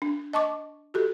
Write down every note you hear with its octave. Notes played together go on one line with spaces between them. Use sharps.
D4
D#5 A5 C#6 D6
F#4 G4 A4